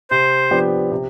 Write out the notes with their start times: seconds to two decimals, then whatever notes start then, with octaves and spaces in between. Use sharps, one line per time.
0.11 C3 C5
0.51 F3 B3 D4 G4
0.92 C3